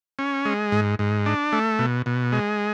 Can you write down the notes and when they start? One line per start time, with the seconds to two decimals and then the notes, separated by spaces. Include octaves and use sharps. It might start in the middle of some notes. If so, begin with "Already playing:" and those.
0.19 C#4
0.45 G#3
0.72 G#2
0.99 G#2
1.26 D4
1.53 A3
1.79 B2
2.06 B2
2.32 G#3